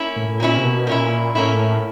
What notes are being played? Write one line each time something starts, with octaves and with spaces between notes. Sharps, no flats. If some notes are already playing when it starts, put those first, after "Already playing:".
Already playing: A#3 C#4 E4
A2
A2
A#2 A#3 C#4 E4
C3
B2
A#2 A#3 C#4 E4
A2 A#3 C#4 E4